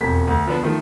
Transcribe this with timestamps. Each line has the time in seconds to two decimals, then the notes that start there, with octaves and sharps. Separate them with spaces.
0.01 E1 F2 B6
0.27 D2
0.46 D3 F3 B3 D4
0.62 D#3 F3 A3